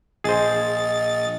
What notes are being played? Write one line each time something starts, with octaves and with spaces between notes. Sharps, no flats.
A#1 G#4 C5 D#5 A6